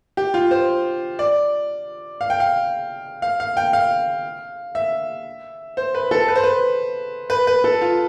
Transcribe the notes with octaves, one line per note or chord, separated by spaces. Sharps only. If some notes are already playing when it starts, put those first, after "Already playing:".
G4
F4
C5
D5
F5
G5
F5
F5
F5
G5
F5
E5
C5
B4
A4
B4
C5
B4
B4
B4
A4
F4